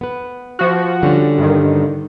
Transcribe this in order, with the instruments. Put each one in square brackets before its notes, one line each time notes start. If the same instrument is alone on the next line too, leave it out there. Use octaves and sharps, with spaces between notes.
[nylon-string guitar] B3 B4
[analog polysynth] F3 F#4
[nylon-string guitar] D3 G3 C#4
[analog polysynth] G2 D#3